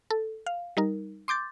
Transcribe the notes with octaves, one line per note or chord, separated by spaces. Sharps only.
A4
F5
G3 D#4 A#4
C6 D6 G6 A6